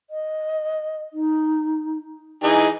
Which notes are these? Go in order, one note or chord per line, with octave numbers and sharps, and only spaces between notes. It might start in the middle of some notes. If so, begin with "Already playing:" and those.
D#5
D#4
E3 D#4 G#4 D#5